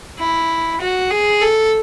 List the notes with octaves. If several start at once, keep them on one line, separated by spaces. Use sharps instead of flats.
E4
F#4
G#4
A4